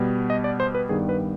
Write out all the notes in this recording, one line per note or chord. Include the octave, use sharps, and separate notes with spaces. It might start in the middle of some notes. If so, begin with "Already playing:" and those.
Already playing: B2 G3 B3
D#5
D5
C5
B4
G2 D#3 G3 B3 G#4
B4